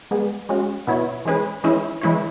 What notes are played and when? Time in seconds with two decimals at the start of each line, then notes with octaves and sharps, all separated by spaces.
0.11 G#3 B3 G#4
0.49 G#3 C#4 F#4
0.87 B2 B3 E4 C#5
1.25 E3 G#3 C#4 G#4 B4
1.64 E3 G#3 C#4 E4
2.01 E3 G#3 E4 C#5